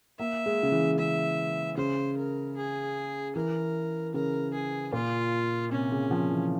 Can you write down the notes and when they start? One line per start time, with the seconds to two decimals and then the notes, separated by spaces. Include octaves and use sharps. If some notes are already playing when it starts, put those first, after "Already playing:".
0.19 A#3 E5
0.46 G#3
0.63 C#3
0.72 E3
0.98 C#3 E5
1.77 C#3 C5
2.17 A#4
2.56 G#4
3.35 E3 A#4
4.14 C#3 A#4
4.53 G#4
4.93 A#2 F4
5.71 C3 C#4
5.92 C#3
6.11 F3
6.31 E3